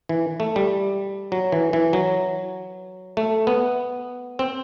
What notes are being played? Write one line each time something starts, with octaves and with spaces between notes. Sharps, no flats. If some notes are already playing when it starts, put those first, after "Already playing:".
E3
A3
G3
F#3
E3
E3
F#3
A3
B3
C4